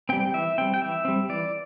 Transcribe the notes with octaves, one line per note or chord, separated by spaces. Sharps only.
G3 C4 G5
E3 E5
G3 C4 G5
G5
E3 E5
G3 C4
E3 D5